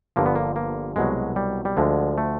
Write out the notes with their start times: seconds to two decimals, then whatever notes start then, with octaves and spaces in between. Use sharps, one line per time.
0.16 G1 G2 D3 F3 A#3
0.26 B3
0.35 A#3
0.56 A#3
0.96 C2 B2 F#3 G#3
1.36 G3
1.65 G3
1.77 D2 D3 F3 G#3
2.18 A3